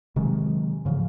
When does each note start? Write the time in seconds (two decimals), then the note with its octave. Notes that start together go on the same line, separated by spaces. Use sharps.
0.16 C3 D#3 F#3 G#3
0.85 G#2 C#3 E3 F3